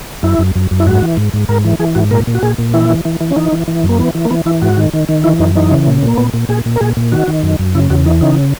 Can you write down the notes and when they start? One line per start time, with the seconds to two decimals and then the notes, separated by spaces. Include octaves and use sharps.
0.23 F#2 E4
0.39 F#2
0.55 F#2
0.71 F#2
0.80 E4
0.87 G#2 F#4
1.02 E3
1.17 G#2
1.33 G#2
1.49 G#2 A#4
1.64 E3
1.79 E3 G#4
1.95 G#2 F#4
2.11 A#2 A#4
2.27 A#2
2.35 F#4
2.43 A#2 G#4
2.58 A#2
2.74 E3 E4
2.90 E3
3.05 E3
3.21 E3
3.31 C#4
3.36 E3 D#4
3.52 E3
3.68 E3
3.83 F#2
3.89 A#3
3.99 E3 B3
4.15 E3
4.25 A#3
4.30 E3 B3
4.46 E3 E4
4.62 G#2 F#4
4.77 D#3
4.94 D#3
5.09 D#3
5.24 E3 E4
5.40 F#2 D#4
5.55 E3 D#4
5.71 C#3
5.87 A#2
6.03 A#2 A#3
6.17 A#2 B3
6.34 A#2
6.49 A#2 G#4
6.66 A#2
6.76 A#4
6.80 A#2 G#4
6.97 A#2
7.12 D#3 F#4
7.28 D#3
7.43 F#2
7.59 F#2
7.75 C#3 E4
7.90 E2 F#4
8.05 E3 D#4
8.21 C#3 D#4